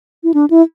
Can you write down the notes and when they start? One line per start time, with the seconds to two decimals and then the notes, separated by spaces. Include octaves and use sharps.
0.24 E4
0.34 D4
0.50 E4